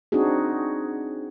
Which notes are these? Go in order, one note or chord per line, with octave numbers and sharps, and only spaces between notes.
C4 D4 D#4 F#4 G#4